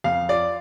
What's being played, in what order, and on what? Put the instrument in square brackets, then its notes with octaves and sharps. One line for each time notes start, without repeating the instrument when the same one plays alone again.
[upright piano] F2 F5
F4 D5